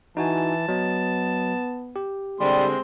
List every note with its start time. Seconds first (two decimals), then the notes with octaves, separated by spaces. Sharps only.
0.17 E3 D#4 F#4 G#5 A5
0.68 F#3 B3 D#5
1.96 G4
2.40 D3 G3 G#3 C4 C6